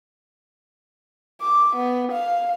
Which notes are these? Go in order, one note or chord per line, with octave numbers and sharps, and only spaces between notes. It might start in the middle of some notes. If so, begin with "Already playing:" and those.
D6
B3
F5